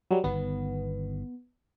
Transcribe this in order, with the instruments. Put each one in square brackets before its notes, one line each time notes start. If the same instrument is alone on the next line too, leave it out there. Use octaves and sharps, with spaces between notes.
[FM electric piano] F#3 G3
[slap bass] G1 D#3 [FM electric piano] B3